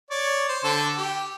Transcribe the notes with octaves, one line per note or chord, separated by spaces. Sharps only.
C#5 D5
C5
D3 A4
G4